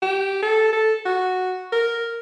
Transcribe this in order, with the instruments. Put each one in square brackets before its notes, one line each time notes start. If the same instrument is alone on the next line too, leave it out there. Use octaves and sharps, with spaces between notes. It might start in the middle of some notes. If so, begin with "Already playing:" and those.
[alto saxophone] G4
A4
A4
F#4
A#4